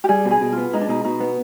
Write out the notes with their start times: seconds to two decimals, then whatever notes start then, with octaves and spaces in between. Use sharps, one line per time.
0.04 G4
0.09 G3 G#4
0.25 B2
0.31 G#4
0.41 B2
0.52 F4
0.58 B3
0.73 G#3 D#4
0.81 D4
0.88 B2 D#4
1.04 B2 D#4
1.20 B3